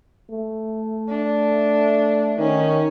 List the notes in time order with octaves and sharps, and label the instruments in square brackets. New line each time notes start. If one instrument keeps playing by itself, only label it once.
[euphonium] A3
[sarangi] D4
[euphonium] D#3 [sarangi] C#4